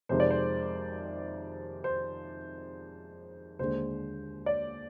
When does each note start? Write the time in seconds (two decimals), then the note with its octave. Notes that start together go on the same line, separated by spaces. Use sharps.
0.09 F2 C3 D#3 G#3 C5
0.20 D5
0.31 C5
1.84 C5
3.59 D#2 D3 G#3 C5
4.46 D5